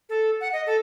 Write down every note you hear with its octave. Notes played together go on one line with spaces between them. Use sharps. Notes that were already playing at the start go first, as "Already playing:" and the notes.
A4
F#5
D#5
A4